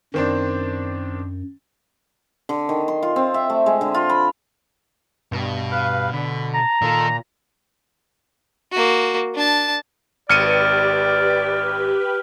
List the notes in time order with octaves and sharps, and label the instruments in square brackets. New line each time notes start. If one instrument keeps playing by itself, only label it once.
[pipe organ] F#2 [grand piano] D#3 C4 D4
[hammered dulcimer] D3
D#3
C6
F4
C4
E5
A3
G#3
D3
F4
B5
[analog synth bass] G2 [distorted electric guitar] B2
[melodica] B4 F5
[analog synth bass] D3 [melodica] B5
[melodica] A5 [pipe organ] A#5
[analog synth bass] A#2 [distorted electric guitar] D#3 D#4 [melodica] F4 A4
[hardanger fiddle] A#3 F#4
D4 A5
[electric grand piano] G#1 C#7 D#7 [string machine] G4 B4 [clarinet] D5 [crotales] F6